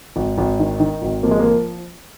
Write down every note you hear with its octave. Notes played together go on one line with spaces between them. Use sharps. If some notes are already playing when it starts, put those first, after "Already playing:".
G#1
G#1
D#3
D#3
G#1
F3 A#3
G#3
A#3
F3